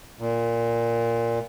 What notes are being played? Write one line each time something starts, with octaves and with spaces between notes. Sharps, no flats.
A#2